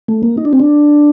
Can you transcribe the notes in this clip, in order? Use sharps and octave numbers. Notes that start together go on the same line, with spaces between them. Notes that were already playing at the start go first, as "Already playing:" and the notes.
A3
A#3
D#4
D4
C4
D4